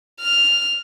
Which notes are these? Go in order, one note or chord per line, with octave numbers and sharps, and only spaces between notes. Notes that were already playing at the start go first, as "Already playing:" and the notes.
F6